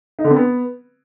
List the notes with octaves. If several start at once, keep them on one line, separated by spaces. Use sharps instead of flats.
D#4
D3
C4
B3